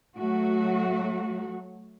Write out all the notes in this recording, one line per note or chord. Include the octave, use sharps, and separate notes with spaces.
F#3 A3 F#4